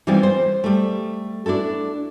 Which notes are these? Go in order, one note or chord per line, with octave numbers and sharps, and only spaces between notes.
E3 G3 G#3 C4 D#4 F4
C5
G3 A3
D4 E4 F#4 A4